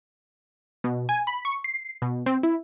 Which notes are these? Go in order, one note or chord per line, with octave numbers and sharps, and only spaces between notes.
B2
G#5
B5
C#6
C7
B2
C4
E4